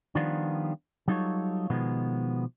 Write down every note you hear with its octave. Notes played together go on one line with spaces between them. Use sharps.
D#3 F3 G3 B3 D4 F4
F#3 G3 D#4 F4 A4 C#5
B2 D#3 F3 G#3 B3